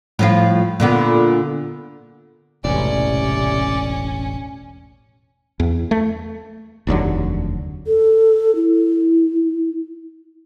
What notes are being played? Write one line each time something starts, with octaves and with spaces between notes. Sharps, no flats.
A2 F3 F4
A#2 D3 B3
E1 A1 C3 C#4 D5
E2
A3
F1 D#2 D3 F#3
A4
E4